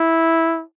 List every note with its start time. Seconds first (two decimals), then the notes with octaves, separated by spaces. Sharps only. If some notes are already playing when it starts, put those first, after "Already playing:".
Already playing: E4